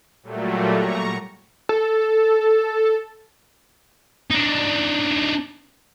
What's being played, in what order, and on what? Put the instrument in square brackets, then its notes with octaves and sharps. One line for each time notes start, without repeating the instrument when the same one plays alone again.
[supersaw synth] A#2 F#3 G3 A3
A#5 C#6
[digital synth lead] A4
[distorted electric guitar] D4 D#4